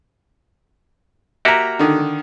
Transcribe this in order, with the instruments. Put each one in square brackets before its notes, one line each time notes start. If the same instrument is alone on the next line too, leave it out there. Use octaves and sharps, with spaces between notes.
[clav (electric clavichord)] A#3 F#4 G4 [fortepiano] E5 A#5
[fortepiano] D3 D#3